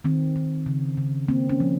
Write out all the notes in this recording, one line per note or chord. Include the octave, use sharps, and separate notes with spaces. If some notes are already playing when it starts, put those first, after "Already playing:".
D#3 C4
D#3
C#3
C#3
A#3 C4
C#4
F3